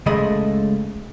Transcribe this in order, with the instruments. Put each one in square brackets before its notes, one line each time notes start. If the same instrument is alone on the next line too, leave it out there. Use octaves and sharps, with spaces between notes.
[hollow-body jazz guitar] C#2 G#3 A3 D#5 B5